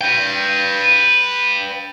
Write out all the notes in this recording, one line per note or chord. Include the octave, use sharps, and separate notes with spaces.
B4 G5